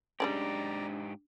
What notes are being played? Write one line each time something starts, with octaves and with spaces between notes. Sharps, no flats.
G#2 C#3 F3 G3 D4 G4 D5 A#5